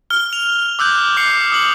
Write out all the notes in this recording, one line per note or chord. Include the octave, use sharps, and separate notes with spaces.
F6 G7
F7
D6 E6 F#6 G6
D6 C7 C#7
D#6 F#7